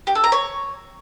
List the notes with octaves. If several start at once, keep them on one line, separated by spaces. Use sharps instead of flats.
G4
A4
A#5
C#5